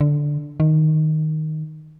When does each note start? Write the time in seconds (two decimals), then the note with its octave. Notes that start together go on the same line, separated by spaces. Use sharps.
0.01 D3
0.60 D#3